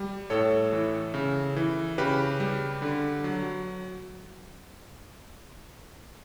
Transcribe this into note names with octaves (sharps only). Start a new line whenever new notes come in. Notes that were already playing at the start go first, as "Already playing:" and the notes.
Already playing: G3
A2 A4 C#5
E3
C#3
E3
C#3 G4 B4
G3
D3
F#3